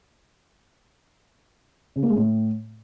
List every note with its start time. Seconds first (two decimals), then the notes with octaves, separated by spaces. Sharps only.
1.96 C#3
2.03 A#3
2.09 G#3
2.16 A2